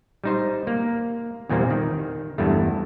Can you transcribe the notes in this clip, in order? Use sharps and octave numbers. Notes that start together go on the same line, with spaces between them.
G3 D#4 C5
A#3
E2 A#2 G3 A#3 C4
D#3
E2 G2 A3